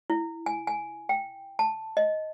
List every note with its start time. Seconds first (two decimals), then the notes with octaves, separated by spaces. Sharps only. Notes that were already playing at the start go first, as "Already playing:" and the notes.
0.10 E4
0.46 G#5
0.67 G#5
1.09 G5
1.59 A5
1.97 D#5